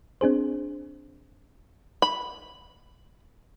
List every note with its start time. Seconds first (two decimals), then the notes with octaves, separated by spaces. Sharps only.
0.21 C4 D4 G#4 C5
2.02 B5